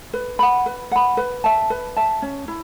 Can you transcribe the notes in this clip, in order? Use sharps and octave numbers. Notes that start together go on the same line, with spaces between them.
B4
F#5 B5
B4
F#5 B5
B4
E5 A5
B4
E5 A5
C#4
E4